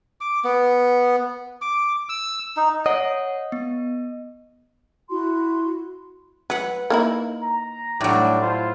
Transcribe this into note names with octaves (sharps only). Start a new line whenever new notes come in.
D6
B3
D6
E6
D#4
C#5 D#5 F#5
B3
E4 F#4 C6
F#3 B4 F#5
A#3 D#4 E4
A#5
A2 F#3 G3 A3 D4
E4 F4 C5